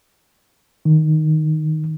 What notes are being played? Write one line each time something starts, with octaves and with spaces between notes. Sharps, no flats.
D#3